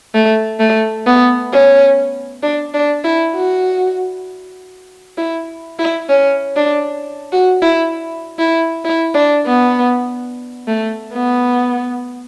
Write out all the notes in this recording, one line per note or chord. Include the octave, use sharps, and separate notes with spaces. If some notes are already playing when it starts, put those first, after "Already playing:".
A3
A3
B3
C#4
D4
D4
E4
F#4
E4
E4
C#4
D4
F#4
E4
E4
E4
D4
B3
A3
B3